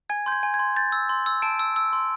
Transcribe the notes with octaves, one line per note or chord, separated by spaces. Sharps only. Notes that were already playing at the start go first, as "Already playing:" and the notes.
G#5 G#6
C6 G6
G#6
G#5
G#6
C6
G6 A6
E6
C6
E6
A5 D7
E6
E6
C6